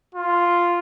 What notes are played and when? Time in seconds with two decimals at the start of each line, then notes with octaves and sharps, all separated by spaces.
0.14 F4